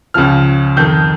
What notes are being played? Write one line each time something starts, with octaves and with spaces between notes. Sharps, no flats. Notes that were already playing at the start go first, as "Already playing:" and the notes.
C#2 C#3 F3 F6
F2 D#3 G6